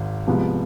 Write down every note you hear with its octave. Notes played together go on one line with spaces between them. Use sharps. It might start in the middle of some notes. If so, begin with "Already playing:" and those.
Already playing: G#1 G#2
C2 C3 F3 G#3 B3